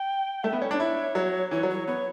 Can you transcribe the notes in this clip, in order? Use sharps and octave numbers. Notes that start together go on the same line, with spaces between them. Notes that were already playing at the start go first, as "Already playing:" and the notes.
Already playing: G5
A3 E5
B3
C#4 C#5
D4
E4
F#3
E3 C#5
F#3
C#5
F#3
B3 C#5